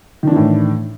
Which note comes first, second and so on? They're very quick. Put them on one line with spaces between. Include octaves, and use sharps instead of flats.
D#3 D4 E3 A2